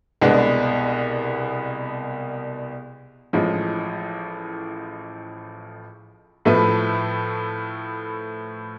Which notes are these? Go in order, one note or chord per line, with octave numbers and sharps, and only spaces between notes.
C2 B2 G#3 B3 D4
A1 A2 F3 G#3
A2 F3 A3 E4 B4